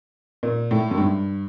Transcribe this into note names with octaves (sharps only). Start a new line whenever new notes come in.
A#2
A2
F#2
G2